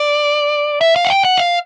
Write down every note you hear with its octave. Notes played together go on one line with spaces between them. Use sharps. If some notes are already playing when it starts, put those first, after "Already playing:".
Already playing: D5
E5
F5
F#5
G5
F#5
F5